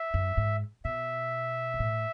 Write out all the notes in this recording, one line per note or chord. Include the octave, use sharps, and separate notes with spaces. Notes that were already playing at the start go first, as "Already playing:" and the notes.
Already playing: E5
F#2
G#2
B2 E5
G#2
A2